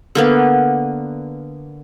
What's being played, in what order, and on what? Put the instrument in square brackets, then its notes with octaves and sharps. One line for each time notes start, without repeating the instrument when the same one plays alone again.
[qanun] D3 A#3 B3